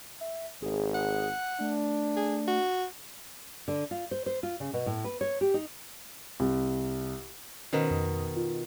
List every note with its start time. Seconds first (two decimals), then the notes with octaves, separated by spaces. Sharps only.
0.21 E5
0.62 G#1 G#4
0.95 F#5
1.60 A3 D4
2.17 G#4
2.48 F#4
3.68 D3
3.91 F4
4.11 C5
4.26 C5
4.43 F4
4.60 C#3
4.73 B2
4.86 A2
5.04 B4
5.21 C#5
5.41 G4
5.54 D#4
6.40 C2
7.73 B2 D#3 C#4 C5
7.90 F2 D#6
8.36 F4